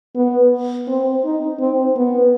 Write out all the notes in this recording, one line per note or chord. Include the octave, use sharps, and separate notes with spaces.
B3
C4
D#4
C4
B3